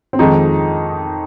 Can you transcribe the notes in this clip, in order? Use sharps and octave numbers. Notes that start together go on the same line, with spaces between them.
C4
F2 D#3 G#3 D#4